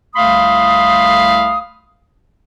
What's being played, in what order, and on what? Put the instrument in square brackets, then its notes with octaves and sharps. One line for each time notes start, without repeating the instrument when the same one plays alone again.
[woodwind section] C2 A3 F5 B5 C6 D#6